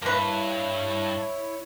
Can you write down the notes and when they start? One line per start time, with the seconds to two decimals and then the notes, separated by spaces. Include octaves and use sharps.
0.02 G2 A#3 E4 B4 C#5